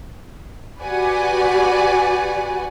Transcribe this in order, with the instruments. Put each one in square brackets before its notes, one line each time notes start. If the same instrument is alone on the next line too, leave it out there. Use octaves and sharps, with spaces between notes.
[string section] F#4 G4 B4 D5 F#5 G#5